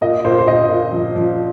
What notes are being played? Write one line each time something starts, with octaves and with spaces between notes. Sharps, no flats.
A#2 D#5
A#2 C5
C5
A#2 D#5
A#2
F3
F3